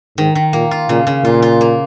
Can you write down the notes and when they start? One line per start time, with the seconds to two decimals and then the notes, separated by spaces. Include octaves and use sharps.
0.18 G#2 D#3
0.35 D#3
0.53 A#2 A#3
0.71 F4
0.89 A#2 C#3
1.07 C#3
1.25 A#2 F4
1.42 F4
1.61 A#3